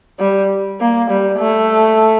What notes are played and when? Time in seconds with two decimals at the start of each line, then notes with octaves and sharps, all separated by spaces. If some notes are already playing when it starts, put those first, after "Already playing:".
0.19 G3
0.80 A#3
1.10 G3
1.40 A3